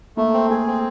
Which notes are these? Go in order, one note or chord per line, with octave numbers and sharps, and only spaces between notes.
A3 A#3
C4
A3 G#4
C4